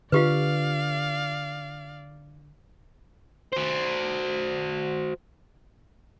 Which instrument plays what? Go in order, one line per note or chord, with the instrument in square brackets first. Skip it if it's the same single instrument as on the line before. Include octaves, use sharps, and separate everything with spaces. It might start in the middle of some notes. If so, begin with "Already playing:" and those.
[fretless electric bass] D3 [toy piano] F4 G4 B4 [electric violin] D5 F5
[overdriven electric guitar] F#4 C5